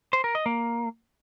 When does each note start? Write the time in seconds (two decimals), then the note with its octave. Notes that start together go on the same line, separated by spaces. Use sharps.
0.13 C5
0.24 A#4
0.35 D#5
0.46 A#3